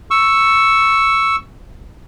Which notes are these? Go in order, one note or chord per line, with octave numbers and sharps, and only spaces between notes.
C#6 E6